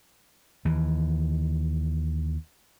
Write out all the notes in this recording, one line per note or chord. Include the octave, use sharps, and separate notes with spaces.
D#2 E3